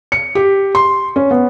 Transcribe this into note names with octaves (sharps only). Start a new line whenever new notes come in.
C#7
G4
C6
C#4
B3